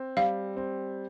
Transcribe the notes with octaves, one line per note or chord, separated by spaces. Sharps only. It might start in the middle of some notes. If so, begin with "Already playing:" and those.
Already playing: C4
G3 F5
C4